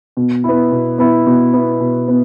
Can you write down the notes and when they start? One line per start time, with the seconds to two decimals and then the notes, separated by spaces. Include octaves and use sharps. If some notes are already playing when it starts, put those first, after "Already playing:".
0.17 B2
0.44 B3 E4
0.72 B2
0.98 B3 E4
1.27 B2
1.53 B3 E4
1.80 B2
2.08 B3